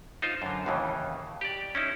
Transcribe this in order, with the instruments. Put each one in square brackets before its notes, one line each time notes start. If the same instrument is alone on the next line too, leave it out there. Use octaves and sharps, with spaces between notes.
[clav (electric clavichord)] D#4 F4 C5
F#2 D3
D#2 A2 C#3 E3
G4 D5
C#4 D#4 E4